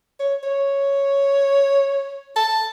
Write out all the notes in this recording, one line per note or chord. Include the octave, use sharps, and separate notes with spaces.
C#5
C#5
A5